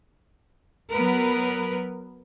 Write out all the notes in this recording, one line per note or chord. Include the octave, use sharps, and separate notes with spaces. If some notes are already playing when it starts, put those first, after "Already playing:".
F#3 B3 A#4 B4